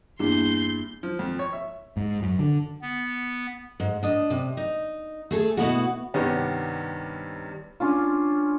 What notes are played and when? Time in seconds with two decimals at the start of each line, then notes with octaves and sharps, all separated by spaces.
0.19 E2 G2 A#3 D4 E4 C6 G6
1.03 F3
1.19 F2
1.39 C#5
1.53 E5
1.97 G#2
2.22 F#2
2.39 D3
2.82 B3
3.80 G#2
4.03 D4 D#5
4.30 C3
4.57 D#4
5.31 A3 G#4 A4
5.57 B2 B3 E4 F#4
6.14 G2 C3 D#3 G3 B3 C#4
7.80 C#4 D4 F4